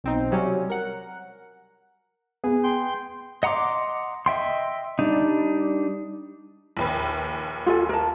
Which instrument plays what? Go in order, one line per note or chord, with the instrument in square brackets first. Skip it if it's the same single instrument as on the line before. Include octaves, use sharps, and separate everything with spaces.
[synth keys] B1 C4 D#4
C3 F#3 G3 C#4
A#4 F#5
[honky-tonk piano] B3 [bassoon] G#4
[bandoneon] G5 C6 G6
[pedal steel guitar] D#5 F#5 A#5 C6 D6
D#5 E5 G5 C6
G3 D4 D#4
[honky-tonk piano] A#1 D#2 B4
[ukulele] F4 A4 G#5
A#4 A5